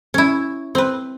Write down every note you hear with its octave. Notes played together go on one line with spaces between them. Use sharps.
C#4 E4
C4 B4